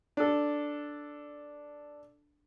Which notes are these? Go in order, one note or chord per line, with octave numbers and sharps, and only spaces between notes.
D4 A4